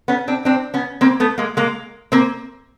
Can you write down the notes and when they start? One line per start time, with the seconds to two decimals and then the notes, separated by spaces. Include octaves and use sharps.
0.08 B3 C#4
0.28 C4 D4
0.45 C4 D4
0.74 B3 C#4
1.01 A#3 C4
1.20 A3 B3
1.38 G#3 A#3
1.57 G#3 A#3
2.12 A#3 C4